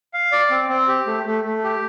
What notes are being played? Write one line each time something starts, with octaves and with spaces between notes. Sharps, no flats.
F5
D5
C4
C4
G4
A3
A3
A3
G4